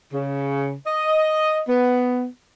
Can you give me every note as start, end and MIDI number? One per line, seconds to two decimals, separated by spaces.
0.12 0.73 49
0.87 1.61 75
1.68 2.25 59